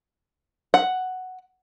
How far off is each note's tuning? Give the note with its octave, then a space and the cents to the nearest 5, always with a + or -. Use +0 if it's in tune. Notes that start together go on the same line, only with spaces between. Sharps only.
F#5 +5